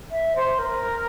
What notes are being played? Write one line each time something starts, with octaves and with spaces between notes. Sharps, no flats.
E5
C5
A#4